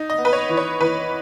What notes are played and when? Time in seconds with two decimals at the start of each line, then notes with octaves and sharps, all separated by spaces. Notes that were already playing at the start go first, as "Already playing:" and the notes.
Already playing: D#4
0.10 D#5
0.18 B3
0.25 B4
0.33 C#5
0.49 E3
0.57 C#5
0.81 E3 B4